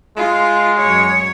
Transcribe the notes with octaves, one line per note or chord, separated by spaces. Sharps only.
G#3 F4
F#2 C#5